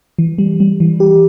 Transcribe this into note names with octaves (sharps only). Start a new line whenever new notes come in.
E3
G3
G3
E3
G4